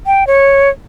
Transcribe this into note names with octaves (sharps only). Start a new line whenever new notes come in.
G5
C#5